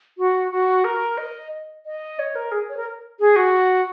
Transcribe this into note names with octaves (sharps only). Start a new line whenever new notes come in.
F#4
F#4
A#4
D#5
D#5
C#5
A#4
G#4
C#5
A#4
G#4
F#4